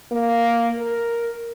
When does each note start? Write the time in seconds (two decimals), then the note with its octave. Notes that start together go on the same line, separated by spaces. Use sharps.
0.12 A#3
0.79 A#4